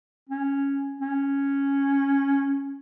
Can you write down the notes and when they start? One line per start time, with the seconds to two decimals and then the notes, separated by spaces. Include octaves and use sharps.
0.29 C#4
1.00 C#4